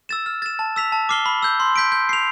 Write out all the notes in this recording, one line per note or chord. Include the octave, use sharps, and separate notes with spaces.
E6 A6 E7
F6
A6 E7
A5
E6 B6 F7
A5
D6 F6 C7 G7
B5
E6 G6
C6
G6 B6 D7
G6
C7 F7